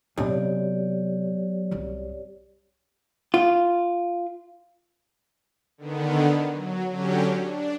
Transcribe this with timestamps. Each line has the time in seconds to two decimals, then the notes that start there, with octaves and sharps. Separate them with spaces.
0.17 B1 C3 C#4 G4 C#5 D5
1.71 C2 F#2
3.34 F4
5.78 D3 D#3 B3
6.52 F#3
6.91 D3 F#3 C#4 G4
7.44 D4